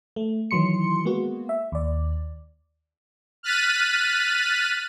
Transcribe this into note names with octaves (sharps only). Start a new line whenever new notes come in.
A3
D#3 E3 F#3 C6 C#7
G#3 A#3 B3 F#4
E5
D#2 D5
F6 F#6 A6 B6 D#7